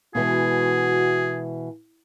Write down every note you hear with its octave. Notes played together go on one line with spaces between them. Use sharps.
B2 E3 G#3 F#4 G#4